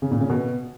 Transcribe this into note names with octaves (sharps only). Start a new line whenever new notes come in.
C#3
A#2
C#3
B2